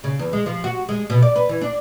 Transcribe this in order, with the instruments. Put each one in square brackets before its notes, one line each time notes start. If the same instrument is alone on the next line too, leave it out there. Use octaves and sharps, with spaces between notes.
[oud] C#3
E2
G#3
F3
F#4
G#3
B2
D5
B4
E3
D4